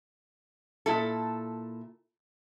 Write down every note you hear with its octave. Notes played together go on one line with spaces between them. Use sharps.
A#2 E4 A4